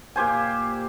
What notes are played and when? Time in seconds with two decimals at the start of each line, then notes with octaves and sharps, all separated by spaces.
0.16 A#2 G4 C5 G#5